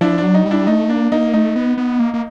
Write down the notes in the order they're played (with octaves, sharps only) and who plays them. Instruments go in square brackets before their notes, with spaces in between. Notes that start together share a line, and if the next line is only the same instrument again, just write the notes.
[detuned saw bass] F3 [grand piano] D4 E4
[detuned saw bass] F#3 [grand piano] D4
[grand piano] D#4
[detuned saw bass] G3
[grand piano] D4 E4
[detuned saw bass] A3 [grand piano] D#4
[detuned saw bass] A#3 [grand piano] D4
[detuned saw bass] A#3 [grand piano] D#4
[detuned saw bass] A3 [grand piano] D#4
[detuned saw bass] B3
B3
A#3
A#3